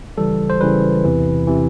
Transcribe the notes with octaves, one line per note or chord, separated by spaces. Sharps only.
C#3 E3 G3 A4
C5
C#3 E3 G3 B4
E2 C3 E3
C3 E3